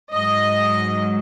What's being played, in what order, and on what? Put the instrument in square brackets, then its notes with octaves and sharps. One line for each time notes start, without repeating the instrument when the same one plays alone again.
[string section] G#2 F#3 D#5